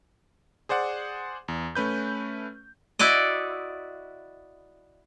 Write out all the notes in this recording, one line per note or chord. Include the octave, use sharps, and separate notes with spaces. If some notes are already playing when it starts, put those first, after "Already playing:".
G#4 C5 D5 F#5
E2
A3 C#4 B4 G6
E4 F#4 D5 D#5